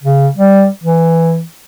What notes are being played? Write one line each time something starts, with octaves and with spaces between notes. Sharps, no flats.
C#3
G3
E3